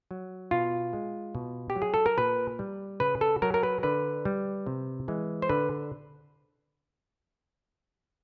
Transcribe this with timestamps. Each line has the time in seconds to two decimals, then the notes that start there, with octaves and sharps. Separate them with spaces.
0.11 F#3
0.51 B2 F4
0.93 G#3
1.35 B2
1.70 G4
1.76 F#3
1.82 G#4
1.94 A4
2.06 A#4
2.18 A#2 B4
2.59 G3
3.00 C#3 B4
3.21 A4
3.42 F#3 A#4
3.54 A#4
3.63 B4
3.83 D3 B4
4.25 G3
4.66 C3
5.08 E3 G#3
5.42 C5
5.49 D3 B4